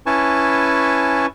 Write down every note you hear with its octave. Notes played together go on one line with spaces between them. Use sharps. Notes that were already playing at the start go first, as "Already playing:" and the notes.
C#4 E4 B4 G#5 A5 C#6